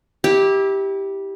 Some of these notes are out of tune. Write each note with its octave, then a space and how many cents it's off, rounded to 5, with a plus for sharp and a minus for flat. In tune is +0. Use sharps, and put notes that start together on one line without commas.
E4 -30 G4 +0